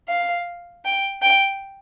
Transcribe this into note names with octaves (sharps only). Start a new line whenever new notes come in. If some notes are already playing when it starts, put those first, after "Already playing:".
F5
G5
G5